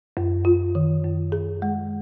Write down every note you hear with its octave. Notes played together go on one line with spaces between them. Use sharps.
F#2
F4
D#3
F#2
G#4
G#3